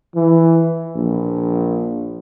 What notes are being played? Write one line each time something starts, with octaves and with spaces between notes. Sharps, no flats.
E3
A#1